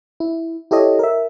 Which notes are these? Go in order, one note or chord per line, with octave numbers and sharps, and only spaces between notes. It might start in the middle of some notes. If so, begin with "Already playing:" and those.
E4
E4 G4 A4 C#5 D#5
A#4 E5